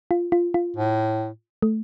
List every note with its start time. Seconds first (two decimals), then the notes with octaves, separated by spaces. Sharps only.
0.11 F4
0.32 F4
0.54 F4
0.76 A2
1.62 A3